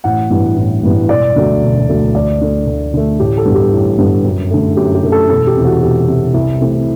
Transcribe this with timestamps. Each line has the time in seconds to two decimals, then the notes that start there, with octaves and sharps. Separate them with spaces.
0.04 A1 F#5
0.30 G2 E3 G3 B3
0.57 A1
0.83 G2 E3 G3 B3
1.09 E1 D5
1.36 D2 D3 F#3 A3
1.62 E1
1.89 D2 D3 F#3 A3
2.15 D2 D5
2.41 D3 A3
2.67 D2
2.94 D3 A3
3.19 A1 G4
3.37 A4
3.45 G2 D3 G3 B3
3.54 G4
3.72 A1
3.98 G2 D3 G3 B3
4.24 F#2
4.51 D3 A3
4.76 F#2 G4
4.94 G4
5.04 D3 A3
5.12 A4
5.29 E1 A4
5.47 G4
5.56 E2 C3
5.65 F#4
5.82 E1 G4
6.08 E2 C3
6.34 C2
6.61 C3 E3 A3